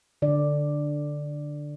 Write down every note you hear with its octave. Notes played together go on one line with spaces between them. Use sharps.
D3 D5